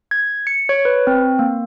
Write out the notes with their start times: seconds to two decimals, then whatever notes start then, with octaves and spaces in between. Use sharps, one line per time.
0.11 G#6
0.47 C#7
0.69 C#5
0.85 B4
1.07 C4
1.39 A#3